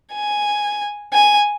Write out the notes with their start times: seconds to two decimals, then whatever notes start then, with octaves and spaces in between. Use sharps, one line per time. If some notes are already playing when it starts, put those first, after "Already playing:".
0.14 G#5
1.13 G#5